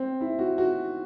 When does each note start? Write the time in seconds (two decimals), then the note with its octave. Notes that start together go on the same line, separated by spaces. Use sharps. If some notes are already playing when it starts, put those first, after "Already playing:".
Already playing: C4
0.21 E4
0.39 F#4
0.58 F#4